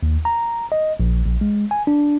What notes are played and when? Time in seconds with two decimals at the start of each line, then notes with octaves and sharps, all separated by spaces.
0.03 D#2
0.25 A#5
0.72 D#5
1.00 A#1
1.26 A#1
1.41 G#3
1.71 G#5
1.87 D4